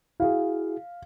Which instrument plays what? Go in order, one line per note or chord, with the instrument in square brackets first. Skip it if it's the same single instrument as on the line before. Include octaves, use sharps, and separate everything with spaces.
[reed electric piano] E4 F#4 G#4 [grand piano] F5